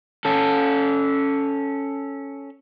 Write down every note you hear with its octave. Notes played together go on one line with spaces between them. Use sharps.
C#4 A4